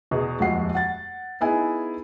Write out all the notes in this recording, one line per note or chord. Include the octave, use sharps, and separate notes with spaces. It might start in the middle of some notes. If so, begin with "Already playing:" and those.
E2 B2 G#4
D#1 F2 G#3 F#4 F#5 C7
F#5 A6
B3 D#4 E4 G#4 E5 G#5